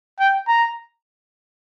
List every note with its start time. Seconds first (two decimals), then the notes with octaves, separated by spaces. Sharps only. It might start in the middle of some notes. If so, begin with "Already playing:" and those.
0.20 G5
0.48 A#5